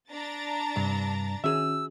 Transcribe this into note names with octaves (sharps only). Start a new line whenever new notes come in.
D4 A#5 A6
G2 C3
D#3 C#4 F#4 G#4 E5 E6